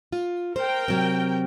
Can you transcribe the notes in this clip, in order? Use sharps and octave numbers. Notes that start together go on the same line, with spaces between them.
F4
A#4 C5 G5
C3 F#3 C4